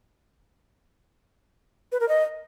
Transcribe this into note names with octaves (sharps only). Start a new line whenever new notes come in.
B4
A#4
D#5